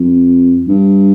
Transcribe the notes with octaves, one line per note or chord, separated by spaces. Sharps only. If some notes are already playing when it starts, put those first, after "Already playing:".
Already playing: F2
G2